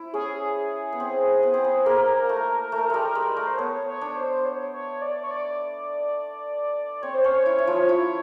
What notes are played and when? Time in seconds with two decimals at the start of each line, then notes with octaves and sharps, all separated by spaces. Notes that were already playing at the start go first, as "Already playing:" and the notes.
Already playing: E4
0.13 C#4 G#4
0.93 B3
1.00 C4
1.43 B3
1.54 C4
1.65 B3
1.86 A#3 A#4
2.29 A3
2.72 A3
2.90 G3 G#3
3.15 G#3
3.37 A3
3.47 C5
3.58 B3 C#5
3.86 C#5
4.01 D4
4.16 C5
4.45 C#5
4.73 C#5
5.02 D5
5.24 C#5
5.31 D5
7.02 C4 C#5
7.14 C5
7.24 C#4 C#5
7.46 E4
7.58 E4
7.67 F3 F4
7.89 E4